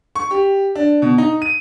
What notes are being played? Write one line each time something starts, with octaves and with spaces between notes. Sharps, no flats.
C#6
G4
D4
B2
D#4
D#7